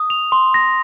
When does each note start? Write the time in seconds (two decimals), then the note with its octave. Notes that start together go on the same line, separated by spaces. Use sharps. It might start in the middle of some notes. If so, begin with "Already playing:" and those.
Already playing: D#6
0.10 F7
0.32 C6
0.54 A#6